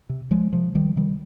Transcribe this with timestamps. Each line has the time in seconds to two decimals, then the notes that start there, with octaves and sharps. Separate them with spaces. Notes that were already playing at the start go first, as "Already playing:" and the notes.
0.09 C3
0.30 C#2 F3 G#3
0.53 C3 F3
0.75 C#2 D#3 G3
0.96 C3 D#3 G3